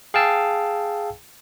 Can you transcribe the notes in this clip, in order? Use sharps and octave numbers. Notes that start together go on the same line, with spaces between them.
G#4 F5 G5 A5 E6